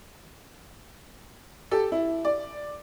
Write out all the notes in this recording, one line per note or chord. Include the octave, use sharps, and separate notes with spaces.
G4 A4
E4
D5